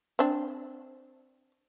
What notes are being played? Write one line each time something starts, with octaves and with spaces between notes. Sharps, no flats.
C4 D4